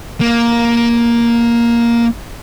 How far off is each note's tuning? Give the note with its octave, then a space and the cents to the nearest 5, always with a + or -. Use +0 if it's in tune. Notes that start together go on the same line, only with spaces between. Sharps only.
A#3 +10